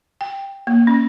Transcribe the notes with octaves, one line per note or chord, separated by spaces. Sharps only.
G5
A#3
C#4